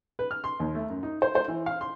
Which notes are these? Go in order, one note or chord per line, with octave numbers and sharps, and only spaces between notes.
B4
F6
C6
D#2
A3
F#2
D#4
C5
C5
E3
F5
C6